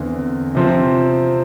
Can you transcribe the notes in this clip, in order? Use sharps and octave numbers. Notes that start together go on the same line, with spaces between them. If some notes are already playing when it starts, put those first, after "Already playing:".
Already playing: E2 D3 C4
C3 F3 C4